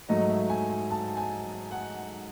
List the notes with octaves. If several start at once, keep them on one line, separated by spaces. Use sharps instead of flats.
G#2 F#3 A3 D#4 D#5
E5
G#5
G#5
A5
G#5
F#5